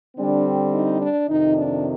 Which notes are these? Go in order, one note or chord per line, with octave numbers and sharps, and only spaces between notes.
D3 G3 C4 D4
D#4
D4
F2 C3 D#3 D#4
D4